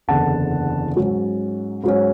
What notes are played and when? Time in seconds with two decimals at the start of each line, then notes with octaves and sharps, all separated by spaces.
0.08 F#1 E2 D3 F#5 A5
0.96 G#2 F#3 C#4
1.84 G#2 F#3 C#4